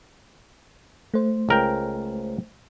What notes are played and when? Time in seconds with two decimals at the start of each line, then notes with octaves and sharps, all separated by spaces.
1.14 A3 C5
1.49 C#2 A#4 G5